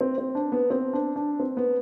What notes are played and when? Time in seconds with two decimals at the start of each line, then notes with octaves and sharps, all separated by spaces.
0.01 C4
0.18 C4
0.35 D4
0.52 B3
0.70 C4
0.93 D4
1.16 D4
1.40 C4
1.57 B3